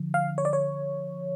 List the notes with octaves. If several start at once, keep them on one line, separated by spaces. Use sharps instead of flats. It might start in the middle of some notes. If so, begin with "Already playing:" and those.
Already playing: D3 F3
F5
C#5
D5
C#5